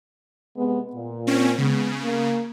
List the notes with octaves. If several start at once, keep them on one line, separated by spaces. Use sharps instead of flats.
C3 G#3 B3
A#2
C4 C#4
C#3 G#3 B3
A#3